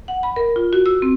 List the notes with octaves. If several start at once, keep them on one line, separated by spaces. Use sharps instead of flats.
F#5
B5
A#4
F4
F#4
E6
C4